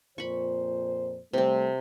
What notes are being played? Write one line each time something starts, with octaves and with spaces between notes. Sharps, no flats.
F2 A#2 C5 B5 C#6
C3 G3 A3 C4